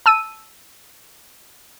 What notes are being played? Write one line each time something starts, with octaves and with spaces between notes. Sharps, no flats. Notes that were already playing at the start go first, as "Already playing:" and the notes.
A5 E6 D#7